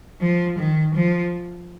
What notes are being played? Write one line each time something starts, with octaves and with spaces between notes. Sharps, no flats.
F3
D#3
F3